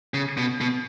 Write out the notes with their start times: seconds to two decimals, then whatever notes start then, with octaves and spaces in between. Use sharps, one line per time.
0.14 C#3
0.37 B2
0.61 B2